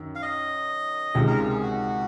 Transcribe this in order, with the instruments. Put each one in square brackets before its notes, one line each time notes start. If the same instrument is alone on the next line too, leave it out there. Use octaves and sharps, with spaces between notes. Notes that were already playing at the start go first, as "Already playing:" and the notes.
Already playing: [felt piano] F#2 D#3
[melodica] F5
D#5
[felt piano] C#2 C3 D#3 G#3
[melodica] A#4
F4
G#4
F#4